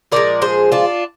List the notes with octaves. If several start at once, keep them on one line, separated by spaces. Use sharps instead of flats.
A#2 F3 G#3 A#4 D5
G#4 C5
D4 F4